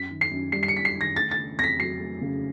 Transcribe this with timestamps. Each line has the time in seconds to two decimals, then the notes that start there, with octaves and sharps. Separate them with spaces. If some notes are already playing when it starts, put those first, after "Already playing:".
Already playing: F#2 B6
0.10 D#3
0.21 C7
0.31 F#2
0.52 G3 C7
0.63 C7
0.68 C#7
0.74 F#2 B6
0.85 C7
0.95 D#3
1.01 A#6
1.16 A3 A6
1.31 A6
1.37 C#3
1.59 F2 A#6
1.64 B6
1.80 F#3 C7
2.00 A3
2.21 C#3